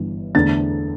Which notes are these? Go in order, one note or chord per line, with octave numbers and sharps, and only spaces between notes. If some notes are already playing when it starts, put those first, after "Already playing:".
Already playing: G1 G2 E3
E2 D3 A3 A6